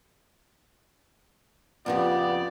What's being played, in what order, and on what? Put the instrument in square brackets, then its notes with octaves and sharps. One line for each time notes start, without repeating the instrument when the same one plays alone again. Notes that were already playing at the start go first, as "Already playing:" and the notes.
[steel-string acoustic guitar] F2 A#2 C#3 [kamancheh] B3 G4 [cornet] D5